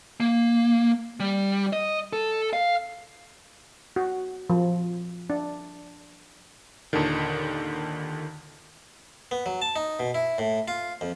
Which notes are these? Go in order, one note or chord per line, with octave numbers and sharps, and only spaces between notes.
A#3
G3
D#5
A4
F5
F#4
F3
D4
D#2 A#2 D3 D#3
B3
F#3
A5
D#4
B2
E4
A2
F4
F2